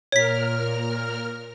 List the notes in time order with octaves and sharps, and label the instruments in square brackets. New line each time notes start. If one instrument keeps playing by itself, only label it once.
[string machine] A#2 A#4 F6 [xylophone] C#5 B6